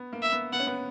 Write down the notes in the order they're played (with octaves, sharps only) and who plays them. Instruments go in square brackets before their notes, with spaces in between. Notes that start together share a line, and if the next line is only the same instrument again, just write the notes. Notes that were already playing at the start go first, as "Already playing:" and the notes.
Already playing: [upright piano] B3
A#3
[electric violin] E5
[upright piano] B3
[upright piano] B3 [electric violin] F#5
[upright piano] C#4
B3